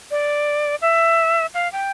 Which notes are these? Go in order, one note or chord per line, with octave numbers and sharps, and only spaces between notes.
D5
E5
F5
G5